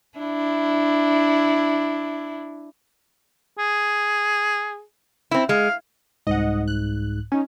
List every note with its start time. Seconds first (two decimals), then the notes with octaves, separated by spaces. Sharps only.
0.18 D4 E4
3.59 G#4
5.31 C4 E4
5.49 G#3 F5
6.27 C2 G#2 D#5 F#5
6.68 F#6
7.32 C#4 D#4 G#5